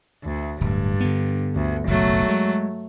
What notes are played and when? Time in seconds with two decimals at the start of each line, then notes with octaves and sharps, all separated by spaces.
0.24 D2
0.61 D1 G2
1.00 D3 B3
1.55 D2
1.87 F#1 B1 F#3 A3
2.29 G#3